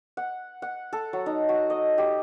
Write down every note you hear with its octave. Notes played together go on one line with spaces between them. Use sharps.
F#5
F#5
A4
F#3
D#4
F#4
D#5
G4